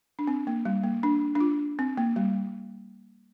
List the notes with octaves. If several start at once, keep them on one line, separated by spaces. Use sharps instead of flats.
D4
C4
A#3
G3
A#3
D4
D4
F4
C4
A#3
G3